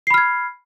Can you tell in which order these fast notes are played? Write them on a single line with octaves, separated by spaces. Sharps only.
C7 B5 F6 G#6